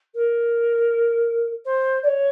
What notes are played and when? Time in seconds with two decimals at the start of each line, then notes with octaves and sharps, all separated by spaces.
0.14 A#4
1.65 C5
2.03 D5
2.07 C#5